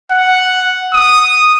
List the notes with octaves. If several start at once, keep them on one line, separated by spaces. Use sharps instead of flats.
F#5
D#6